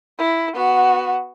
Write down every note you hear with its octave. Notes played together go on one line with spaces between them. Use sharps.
E4
B3 F#4